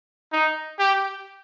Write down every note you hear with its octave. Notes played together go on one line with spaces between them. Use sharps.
D#4
G4